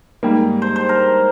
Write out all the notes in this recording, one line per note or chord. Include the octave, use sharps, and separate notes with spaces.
G#2 G3 A#3
C5
C5
A#4